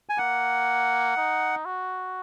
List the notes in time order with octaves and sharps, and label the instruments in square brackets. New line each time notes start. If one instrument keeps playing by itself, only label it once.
[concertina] G#5
[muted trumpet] A#3 [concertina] F#5
[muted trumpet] D#4
F#4